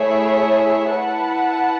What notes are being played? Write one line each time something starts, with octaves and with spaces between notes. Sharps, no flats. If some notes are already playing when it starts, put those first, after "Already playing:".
Already playing: A3 E4 G#4 C#5 E5
E4 B4 F#5 A5